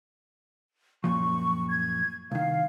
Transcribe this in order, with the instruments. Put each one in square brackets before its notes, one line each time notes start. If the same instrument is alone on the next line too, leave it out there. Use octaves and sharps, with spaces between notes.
[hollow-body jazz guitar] F#2 A#2 F3 [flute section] C#6
[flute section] G#6
[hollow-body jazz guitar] C2 D#3 [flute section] F5